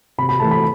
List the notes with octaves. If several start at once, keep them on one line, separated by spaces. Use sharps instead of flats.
C3 B5
B5
E3 A3 A5
B5